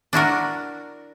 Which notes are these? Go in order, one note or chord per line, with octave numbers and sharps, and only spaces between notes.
D4 E4 F#4 A#4